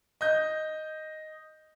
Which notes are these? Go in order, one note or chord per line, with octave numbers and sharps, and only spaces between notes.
D#5 G6